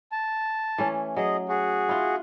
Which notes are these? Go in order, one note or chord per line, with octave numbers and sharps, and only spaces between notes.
A5
E3 A3 C#4
F#3 G#4 D#5
F#4 G#4
E4 F4